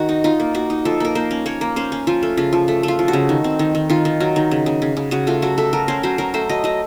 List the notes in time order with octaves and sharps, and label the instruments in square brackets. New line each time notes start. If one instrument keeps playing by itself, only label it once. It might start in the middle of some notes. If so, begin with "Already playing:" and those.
Already playing: [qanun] D#3 F#4
D#4
D#4 F4
A#3
A#3 F#4
D#4
F3 A4
A#3 A#4
A#3 C5
C#4
A#3 C#5
A#3
C#4 C5
C#4
F3 F4
A3
C#3 F4
F3
A3
A3 F4
F3
F#4
C#3
D#3
C4
D#3
D#3
D#3 F4
D#3
F#3
D#3
C#3
C#3
C#3
C#3
C#3 F#4
A3 F4
F#3 F#4
A3 A4
F#3 A#4
C#4 C5
F#3 C5
F#3 A#4
A3 C5
F#3 D#5
F#3 D#5